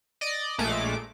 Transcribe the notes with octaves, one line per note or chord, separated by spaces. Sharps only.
D5 D#5
A#1 A#2 G#3 A3 D6